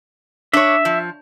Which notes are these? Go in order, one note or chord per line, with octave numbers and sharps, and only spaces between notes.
D4 C#5 E5
F3